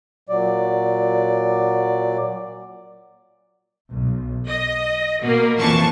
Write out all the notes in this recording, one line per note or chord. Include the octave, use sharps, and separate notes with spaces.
A#2 F#3 D5
B1
D#5
B2 A#3
F2 A#2 E3 A#3 A5 C#6